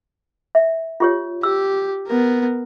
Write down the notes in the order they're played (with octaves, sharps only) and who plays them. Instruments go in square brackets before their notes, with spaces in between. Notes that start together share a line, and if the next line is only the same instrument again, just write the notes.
[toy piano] E5
F4 G4 C#5
[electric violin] G4 [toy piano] E6
[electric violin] B3 A#4